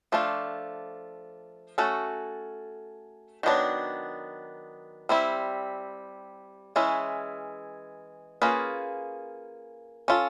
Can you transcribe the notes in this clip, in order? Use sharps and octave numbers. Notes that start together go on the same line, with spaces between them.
F3 A3 D4 F4
A3 C#4 F#4 A4
D#3 F#3 B3 D4
G3 C4 E4
E3 G#3 C#4 E4
A#3 C#4 F4 G#4 B4
C#4 F4 A4